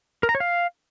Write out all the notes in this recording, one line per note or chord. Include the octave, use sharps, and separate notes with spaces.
A#4
A#5
C#5
F5